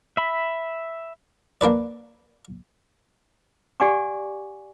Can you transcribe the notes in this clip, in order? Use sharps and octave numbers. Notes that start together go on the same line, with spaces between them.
E5 B5
A#3 D4 B4 D5
G4 D5 F#5 G#5 C#6 D6